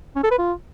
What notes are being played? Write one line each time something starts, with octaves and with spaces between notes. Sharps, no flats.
C#4
A4
B4
F4